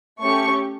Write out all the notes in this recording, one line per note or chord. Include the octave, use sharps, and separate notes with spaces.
A3 C#4 G4 C#6